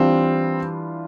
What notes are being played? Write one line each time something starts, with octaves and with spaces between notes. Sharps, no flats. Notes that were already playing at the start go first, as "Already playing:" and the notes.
Already playing: E3 G3 C4 D4 F4